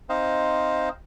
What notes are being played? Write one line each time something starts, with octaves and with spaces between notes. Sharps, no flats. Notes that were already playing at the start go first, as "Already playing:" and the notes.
C4 D#4 C5 D#5 F5